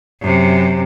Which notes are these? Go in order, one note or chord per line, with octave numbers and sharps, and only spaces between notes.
F#2 C3